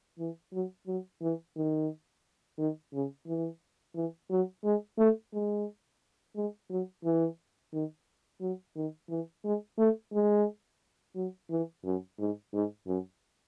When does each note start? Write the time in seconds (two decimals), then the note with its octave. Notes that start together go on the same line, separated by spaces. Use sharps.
0.18 E3
0.53 F#3
0.87 F#3
1.22 E3
1.56 D#3
2.58 D#3
2.93 C#3
3.27 E3
3.95 E3
4.30 F#3
4.64 G#3
4.98 A3
5.33 G#3
6.36 G#3
6.70 F#3
7.05 E3
7.73 D#3
8.41 F#3
8.76 D#3
9.10 E3
9.44 G#3
9.78 A3
10.13 G#3
11.15 F#3
11.50 E3
11.84 F#2
12.19 G#2
12.53 G#2
12.87 F#2